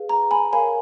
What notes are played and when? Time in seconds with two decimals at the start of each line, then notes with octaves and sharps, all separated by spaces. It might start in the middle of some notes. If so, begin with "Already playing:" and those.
Already playing: G#4 B4 F5
0.09 A#5
0.31 G#5 B5
0.52 A#4 C#5 F5 G#5 B5